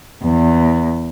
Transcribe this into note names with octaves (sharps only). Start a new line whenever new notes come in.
E2